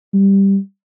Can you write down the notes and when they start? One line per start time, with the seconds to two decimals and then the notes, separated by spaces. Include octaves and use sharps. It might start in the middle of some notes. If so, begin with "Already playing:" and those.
0.13 G3